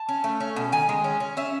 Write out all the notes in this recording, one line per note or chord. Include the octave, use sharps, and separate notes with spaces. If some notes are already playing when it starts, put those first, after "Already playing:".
Already playing: A5
C#4
A3
C#4
B2
D#3 G#5
G#3
C#4
C#4
C#4 E5